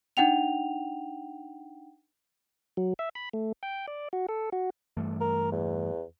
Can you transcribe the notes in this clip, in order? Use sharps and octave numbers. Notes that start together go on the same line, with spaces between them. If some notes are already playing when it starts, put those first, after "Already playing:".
D4 D#4 F#5 G5 F7
F#3
E5
B5
A3
G5
D5
F#4
A4
F#4
G2 E3 A3
A#4
E2